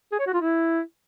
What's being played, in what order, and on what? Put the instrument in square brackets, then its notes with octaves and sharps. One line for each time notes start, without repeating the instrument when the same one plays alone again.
[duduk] G#4
C#5
F#4
F4
E4